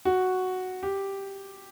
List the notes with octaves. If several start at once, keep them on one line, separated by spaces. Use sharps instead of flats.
F#4
G4